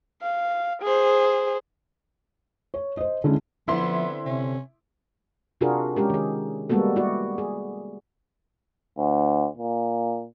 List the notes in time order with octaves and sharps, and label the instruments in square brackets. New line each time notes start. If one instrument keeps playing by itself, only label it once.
[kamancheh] F5
G#4 C5
[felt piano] C#5
C5 D#5
D3 G#3 C#4 E4
[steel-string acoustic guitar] D3 C4 [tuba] F3 [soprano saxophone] B3 [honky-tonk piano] E4 C6
[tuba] C3 [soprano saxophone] C#4
[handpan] C3 D4 F4 F#4 G#4 A#4
G#3 C#4 G4 A#4
D#3 G#4
G3 G#3 A#3 B3 F#4 A4
E4 F#4 D5
G#4
[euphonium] D2
A#2